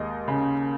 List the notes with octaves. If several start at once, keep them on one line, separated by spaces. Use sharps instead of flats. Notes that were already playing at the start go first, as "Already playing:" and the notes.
Already playing: D#2 G#3 D#5
C#3